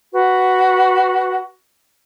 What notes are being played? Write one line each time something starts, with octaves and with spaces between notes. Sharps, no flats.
F#4 B4